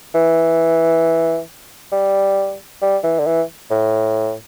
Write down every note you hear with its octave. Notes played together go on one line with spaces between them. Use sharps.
E3
G3
G3
E3
D3
E3
A2